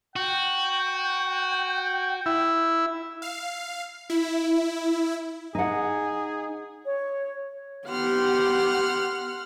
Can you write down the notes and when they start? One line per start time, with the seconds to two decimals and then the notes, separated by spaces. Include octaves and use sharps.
0.16 F#4 G5
2.26 E4
3.22 F5
4.10 E4
5.55 D#4 G#4 F#5
6.86 C#5
7.88 B3 G4 F#5 C6 F6